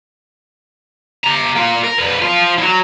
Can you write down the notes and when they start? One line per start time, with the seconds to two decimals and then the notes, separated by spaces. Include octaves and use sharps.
1.24 G4 A#5
1.56 A#3 F4
1.84 A#4
1.98 F2 B4
2.22 F3 F4
2.58 E3 F#3